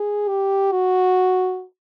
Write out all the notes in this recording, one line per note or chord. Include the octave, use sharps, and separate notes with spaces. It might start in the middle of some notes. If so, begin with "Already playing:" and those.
Already playing: G#4
G4
F#4